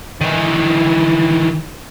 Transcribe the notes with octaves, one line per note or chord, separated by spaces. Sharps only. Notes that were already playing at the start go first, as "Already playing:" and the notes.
D#3 E3